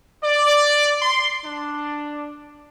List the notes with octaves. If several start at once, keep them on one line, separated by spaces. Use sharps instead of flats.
D5
C6
D4